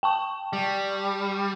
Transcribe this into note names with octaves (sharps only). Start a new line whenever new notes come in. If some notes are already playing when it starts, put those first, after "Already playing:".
G5 A5 C#6
G3